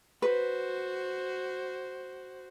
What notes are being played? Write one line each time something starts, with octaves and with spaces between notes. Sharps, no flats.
F#4 B4 C5